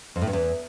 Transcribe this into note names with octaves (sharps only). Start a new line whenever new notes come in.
F2
A2
G2
E2